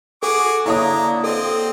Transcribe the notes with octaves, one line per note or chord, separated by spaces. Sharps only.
F#4 G#4 A4 D6
D3 A#3 D4 E4 C#5 A#5 D#6
C4 A4 D#5